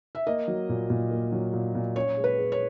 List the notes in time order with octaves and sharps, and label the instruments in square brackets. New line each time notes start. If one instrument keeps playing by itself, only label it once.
[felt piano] E5
[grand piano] A#3 [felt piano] D#5
[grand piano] F#3
A#2
A#2
A#3
F#3
A#2
A#2
[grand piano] C#4 [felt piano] C#5
[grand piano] G#3
[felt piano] B4
[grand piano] G#4
[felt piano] C#5